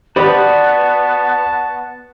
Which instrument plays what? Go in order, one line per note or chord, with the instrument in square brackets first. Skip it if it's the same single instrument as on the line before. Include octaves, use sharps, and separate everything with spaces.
[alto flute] B3 [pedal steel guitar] F#4 D5 D#6 [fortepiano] G4 B4 C5 [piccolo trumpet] A5